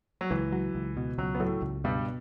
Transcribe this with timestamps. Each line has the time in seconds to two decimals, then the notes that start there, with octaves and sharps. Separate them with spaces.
0.21 F#3
0.31 C#2 E3
0.52 F#3
0.75 C#2
0.97 B2
1.18 C#2 F#3
1.35 B3
1.40 A2 F#3 A3
1.62 C#2
1.84 G2 B2 G3